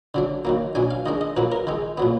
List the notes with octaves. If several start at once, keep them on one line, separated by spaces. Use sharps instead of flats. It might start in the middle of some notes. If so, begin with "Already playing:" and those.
D3 F#3 D4
D#3 F#3 A#3
B2 F#3 D4 G#5
F5
D#3 G#3 D4 D#5
D#5
A#2 F#3 A#3 B4
A#4
D#3 G#3 D#4
A#2 F#3 B3